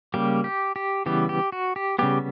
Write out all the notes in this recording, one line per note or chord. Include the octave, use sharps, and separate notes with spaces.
C#3 G3 A#3 G4
G4
G4
C#3 E3 G3 B3 G4
G4
F#4
G4
C#3 G3 B3 G4